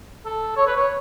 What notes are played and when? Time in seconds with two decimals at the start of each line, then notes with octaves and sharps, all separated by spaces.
0.25 A4
0.57 C#5
0.67 B4
0.76 C#5